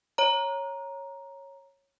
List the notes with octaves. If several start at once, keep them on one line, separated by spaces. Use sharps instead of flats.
C#5 A#5